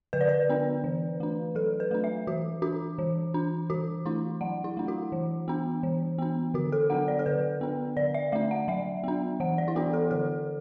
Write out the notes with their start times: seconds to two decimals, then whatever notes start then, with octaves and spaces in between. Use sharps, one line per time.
0.13 D3 B4
0.21 D5
0.29 B4
0.49 B3 D4
0.84 E3
1.20 A3 D4
1.55 F#3 A4
1.80 B4
1.91 A3 D4
2.04 E5
2.27 E3 F#4
2.62 D4 F#4
2.98 E3
3.34 D4
3.70 E3 F#4
4.06 A3 D4 E4
4.41 F#3 F#5
4.64 E4
4.77 A3 D4
4.88 F#4
5.12 E3
5.48 B3 D4
5.83 E3
6.18 B3 D4
6.54 D3 F#4
6.72 A4
6.90 F#3 B3 D4 F#5
7.08 D5
7.19 A4
7.26 D3 B4
7.61 B3 D4
7.97 D3 D5
8.14 E5
8.32 A3 D4 E5
8.51 F#5
8.68 F#3 E5
9.04 B3 D4
9.40 E3 F#5
9.58 D5
9.68 E4
9.76 B3 D4 F#4
9.93 A4
10.11 D3 A4